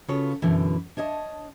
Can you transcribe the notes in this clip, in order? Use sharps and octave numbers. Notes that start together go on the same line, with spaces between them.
C#3 B3 F4 F#4 A4 C#5
F#2 B2 D3 E3
D4 C#5 D#5 E5 A5